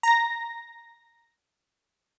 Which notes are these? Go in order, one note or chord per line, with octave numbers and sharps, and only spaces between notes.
A#5 A#6